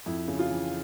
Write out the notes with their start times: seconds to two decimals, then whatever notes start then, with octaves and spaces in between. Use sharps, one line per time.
0.06 F2 E4
0.28 C#3
0.39 F4
0.50 E3